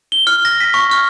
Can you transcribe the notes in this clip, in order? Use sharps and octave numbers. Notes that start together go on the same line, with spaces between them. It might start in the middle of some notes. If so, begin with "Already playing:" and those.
G7
F6
A#6
B6
C#6
F6